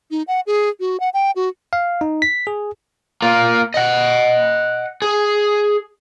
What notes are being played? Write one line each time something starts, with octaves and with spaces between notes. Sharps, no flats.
D#4
F#5
G#4
F#4
F#5
G5
F#4
F5
D#4
B6
G#4
A#3 F4
D#5 F#5
G#4